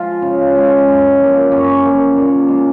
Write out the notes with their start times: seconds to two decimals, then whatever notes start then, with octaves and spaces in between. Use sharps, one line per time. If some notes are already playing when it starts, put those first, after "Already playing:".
Already playing: F3 G#3 F4
0.22 C#3
0.56 F3 G#3
0.87 F#2
1.20 F3 A#3
1.52 F#2 C#4
1.84 F3 A#3
2.17 A#2
2.48 G#3